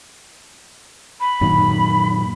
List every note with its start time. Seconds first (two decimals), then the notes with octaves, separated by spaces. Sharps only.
1.21 B5
1.41 F#2 A#2 D#3